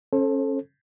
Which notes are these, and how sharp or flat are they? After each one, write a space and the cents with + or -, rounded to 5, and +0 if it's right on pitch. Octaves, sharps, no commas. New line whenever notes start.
C#4 -30 A4 -5 C5 +35